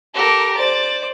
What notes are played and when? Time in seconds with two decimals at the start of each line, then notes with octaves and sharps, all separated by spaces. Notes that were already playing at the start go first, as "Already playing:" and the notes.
0.15 G4 A4 A#4
0.57 C5 D5 A6